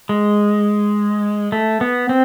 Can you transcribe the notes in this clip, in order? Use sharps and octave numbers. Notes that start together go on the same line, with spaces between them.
G#3
A3
B3
C4